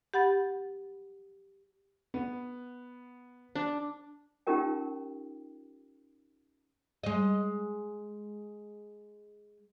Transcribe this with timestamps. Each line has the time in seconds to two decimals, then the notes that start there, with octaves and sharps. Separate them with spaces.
0.14 G4 F#5 B5 A6
2.14 B3
3.55 D4
4.47 C#4 D#4 F4 G4 A#4 G5
7.04 G#3 D#5